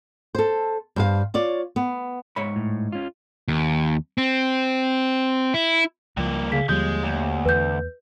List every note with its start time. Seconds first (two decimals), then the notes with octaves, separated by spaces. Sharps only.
0.35 A4 C5
0.96 G2 C5 F5
1.34 F4 C#5 D5
1.76 B3
2.36 G#2 C#5 B5
2.56 A2
2.92 C#4 F4
3.48 D#2
4.18 C4
5.54 E4
6.17 C#2 G2 F3 A#3
6.52 C#3 B6
6.69 D#2 D3 F3 G3 G#3 G6
7.03 D2
7.46 E2 B4 G6